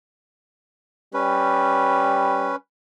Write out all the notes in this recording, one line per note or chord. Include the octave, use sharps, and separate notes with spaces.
G3 C#4 B4